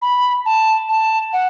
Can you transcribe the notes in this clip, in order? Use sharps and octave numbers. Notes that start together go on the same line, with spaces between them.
B5
A5
A5
F#5